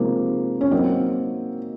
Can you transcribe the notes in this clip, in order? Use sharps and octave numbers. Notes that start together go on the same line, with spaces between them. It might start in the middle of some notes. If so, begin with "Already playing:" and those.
Already playing: C3 F3 G#3 A#3 C4 D#4
C#4
F#3 A#3 C4 D#4 A#4 D#5